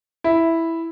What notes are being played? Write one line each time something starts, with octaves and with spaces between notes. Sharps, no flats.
E4